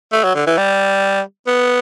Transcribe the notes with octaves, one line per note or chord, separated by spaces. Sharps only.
A3
F#3
D3
E3
G3
B3